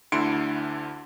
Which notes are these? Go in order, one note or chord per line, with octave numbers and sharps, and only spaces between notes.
D2 D3 E4 C6 C#7 D7